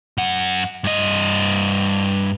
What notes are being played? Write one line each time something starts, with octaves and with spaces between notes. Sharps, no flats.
F#2 F#5
G2 D#5